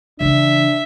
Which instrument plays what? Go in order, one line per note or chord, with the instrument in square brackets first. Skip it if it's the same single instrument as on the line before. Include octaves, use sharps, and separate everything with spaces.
[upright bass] C#3 E3 [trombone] D4 [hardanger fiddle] E5